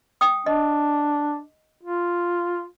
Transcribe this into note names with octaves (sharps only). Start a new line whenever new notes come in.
G5 D#6
D4 D#5
F4